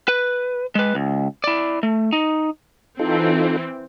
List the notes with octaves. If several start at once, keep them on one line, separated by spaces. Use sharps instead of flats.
B4
G#3 B4
C#2
E4 D5
A3
D#4
E3 C4 D#4 F4 A4